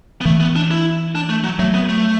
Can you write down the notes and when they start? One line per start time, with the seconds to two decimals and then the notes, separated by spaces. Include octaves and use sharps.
0.21 B3
0.25 E3 A3
0.40 B3
0.56 D4
0.71 E4
1.15 D4
1.29 A3
1.44 F#3
1.59 F#3 A3
1.74 B3
1.89 A3